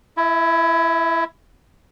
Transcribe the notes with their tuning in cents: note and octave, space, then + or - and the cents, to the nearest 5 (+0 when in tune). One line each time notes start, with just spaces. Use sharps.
E4 +20 E5 -30